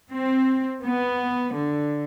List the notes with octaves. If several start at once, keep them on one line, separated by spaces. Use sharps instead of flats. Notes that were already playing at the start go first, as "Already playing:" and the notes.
C4
B3
D3